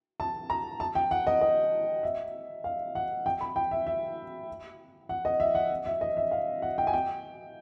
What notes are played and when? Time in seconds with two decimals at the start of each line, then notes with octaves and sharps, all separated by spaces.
0.20 A5
0.50 A#5
0.80 A5
0.95 G5
1.11 F#5
1.27 D#5
1.41 D#5
2.03 E5
2.64 F5
2.95 F#5
3.26 G5
3.41 B5
3.56 G5
3.71 E5
3.87 E5
5.09 F#5
5.25 D#5
5.40 E5
5.55 F#5
5.86 E5
6.01 D#5
6.17 E5
6.31 F5
6.62 F#5
6.78 G5
6.87 G#5
6.93 G5